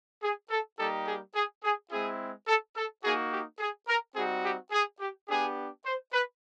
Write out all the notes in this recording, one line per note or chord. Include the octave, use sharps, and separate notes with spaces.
G#4
A4
G3 A#3 D#4 G4 A4
G#4
G#4
G#4
G#3 C4 E4 G#4
A4
A4
A#3 D#4 F#4 G#4
G4
G#4
A#4
G3 C4 D#4 F#4 G#4
G4
G#4
G4
B3 D4 G4 G#4
C5
B4